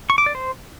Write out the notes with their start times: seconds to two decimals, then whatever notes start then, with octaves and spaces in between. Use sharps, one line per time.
0.10 C#6
0.18 D6
0.26 D5
0.35 C5